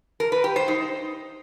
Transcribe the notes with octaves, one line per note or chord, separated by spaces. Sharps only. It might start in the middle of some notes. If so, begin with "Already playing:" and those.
A#4
B4
G4
C5
D#4